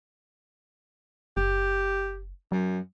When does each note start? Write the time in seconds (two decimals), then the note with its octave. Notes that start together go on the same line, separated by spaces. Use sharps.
1.37 F#1 G4
2.52 F#2 F#3